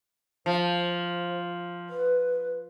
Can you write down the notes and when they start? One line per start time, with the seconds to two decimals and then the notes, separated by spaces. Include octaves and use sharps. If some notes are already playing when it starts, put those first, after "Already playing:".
0.46 F3 C5
1.90 B4